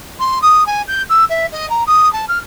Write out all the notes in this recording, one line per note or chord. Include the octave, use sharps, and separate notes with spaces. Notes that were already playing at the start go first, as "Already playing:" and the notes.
C6
D#6
G#5
G6
E6
E5
D#5
A#5
D#6
A5
F6